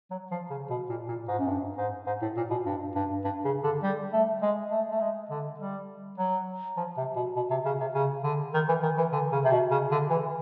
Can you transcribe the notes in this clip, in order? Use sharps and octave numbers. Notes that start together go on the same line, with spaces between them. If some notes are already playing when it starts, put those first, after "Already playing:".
F#3
F3
C#3
B2
A#2
A#2
G#2
F#2
G2
G#2
G#2
A2
A#2
B2
G2
G2
G2
C#3
D3
G3
A3
G#3
A3
A3
G#3
D3
G3
F#3
F3
C3
B2
B2
C3
C#3
C3
C#3
D3
D#3
E3
D#3
E3
D3
C#3
C3
B2
C#3
D3
E3